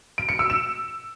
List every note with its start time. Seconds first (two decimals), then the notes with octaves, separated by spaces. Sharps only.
0.18 D7
0.29 C#7
0.39 E6
0.50 E7